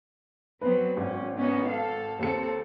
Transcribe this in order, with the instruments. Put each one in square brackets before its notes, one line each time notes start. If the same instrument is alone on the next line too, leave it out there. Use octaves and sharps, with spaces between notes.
[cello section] F#3 B3 C4 [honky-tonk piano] B4
[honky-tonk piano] G#1 [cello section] C#4
[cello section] B3 C#4 D#4
A4 F5
[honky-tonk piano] D#2 C#7 [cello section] C4 A4